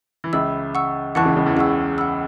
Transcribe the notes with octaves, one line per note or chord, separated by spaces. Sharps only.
E3
C#2 C#3 E5 B5 E6
F#5 C#6 E6
E2 E3 F#5 A5 C#6 F#6
C#2 C#3
C#2 C#3
E2 E3
C#2 C#3 F#5 C#6 E6
F#5 B5 E6